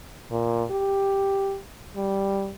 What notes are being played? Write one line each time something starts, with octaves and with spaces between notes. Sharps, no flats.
A#2
G4
G3